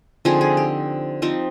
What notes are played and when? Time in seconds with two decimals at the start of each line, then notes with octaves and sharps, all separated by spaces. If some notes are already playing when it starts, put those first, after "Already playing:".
0.25 D3 F3 C4 D#4 G#4
0.41 G#4
0.57 G4
1.22 F3 C4 D#4